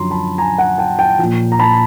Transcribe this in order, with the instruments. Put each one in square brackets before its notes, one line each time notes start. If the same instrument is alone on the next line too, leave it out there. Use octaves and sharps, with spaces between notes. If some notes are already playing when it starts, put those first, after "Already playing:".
Already playing: [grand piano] F#2 D3 F3 A#5 C6
A5 B5
G#5 A#5
F#5 G#5
G5 A5
G5 A5
A#2 F3
A#5
A5 B5